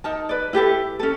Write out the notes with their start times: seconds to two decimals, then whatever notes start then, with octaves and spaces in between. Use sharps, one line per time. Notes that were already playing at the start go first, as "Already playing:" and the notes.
0.04 D#4 A#4 A5
0.29 B4 D5
0.53 E4 G4 A4 B4
0.99 C#4 A4